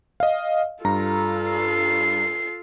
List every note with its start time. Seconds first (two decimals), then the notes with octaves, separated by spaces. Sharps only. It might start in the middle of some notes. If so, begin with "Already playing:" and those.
0.20 D#5 F5
0.85 G2 F4 A4 A#5
1.51 C7